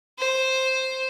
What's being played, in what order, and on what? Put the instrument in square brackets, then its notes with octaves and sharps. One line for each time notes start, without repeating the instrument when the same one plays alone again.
[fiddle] C5